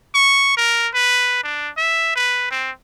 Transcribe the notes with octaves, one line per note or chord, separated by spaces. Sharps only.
C#6
A#4
B4
D4
E5
B4
C4